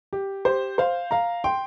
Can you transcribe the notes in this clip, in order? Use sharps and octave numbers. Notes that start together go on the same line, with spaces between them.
G4
G4 C5
C5 F5
F5 A#5
G5 C6